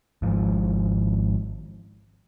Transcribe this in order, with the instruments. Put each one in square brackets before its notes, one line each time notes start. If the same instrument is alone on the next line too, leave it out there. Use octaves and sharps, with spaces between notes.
[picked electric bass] G#1 G#2 F3